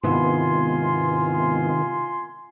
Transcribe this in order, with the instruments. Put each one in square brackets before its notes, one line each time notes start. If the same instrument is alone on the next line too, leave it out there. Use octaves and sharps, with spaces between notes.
[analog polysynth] G#2 B3 E4 [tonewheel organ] C3 D#3 [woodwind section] F4 G#5 C6